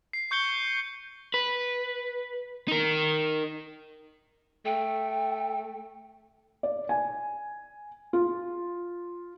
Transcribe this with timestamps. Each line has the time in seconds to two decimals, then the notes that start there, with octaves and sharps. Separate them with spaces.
0.13 C7
0.31 C#6 G6 C#7 G7
1.34 B4
2.68 D#4 A#4
4.66 A3 G5
6.63 D5
6.89 G#5
8.13 F4